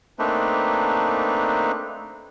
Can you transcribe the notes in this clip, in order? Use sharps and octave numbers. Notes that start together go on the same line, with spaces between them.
A3 A#3 C4 D4 D#4 B4